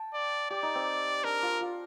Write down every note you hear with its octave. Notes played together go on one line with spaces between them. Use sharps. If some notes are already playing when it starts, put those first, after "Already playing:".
Already playing: G5 A5
D5
G4 D5
D#4
C4
D4 A#4
F4
F4